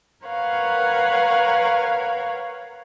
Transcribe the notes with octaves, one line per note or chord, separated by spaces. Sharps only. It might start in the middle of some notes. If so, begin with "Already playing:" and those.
A#4 B4 C#5 F5 F#5